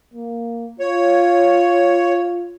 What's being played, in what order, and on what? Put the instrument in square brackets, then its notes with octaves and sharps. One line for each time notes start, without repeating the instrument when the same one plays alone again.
[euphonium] A#3
[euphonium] F4 [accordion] C#5